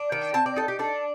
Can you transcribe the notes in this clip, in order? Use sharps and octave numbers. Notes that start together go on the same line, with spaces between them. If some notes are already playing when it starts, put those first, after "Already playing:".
Already playing: D4
D#3 G5
C4 A5
D5
D#4 A4
G4
D4 A4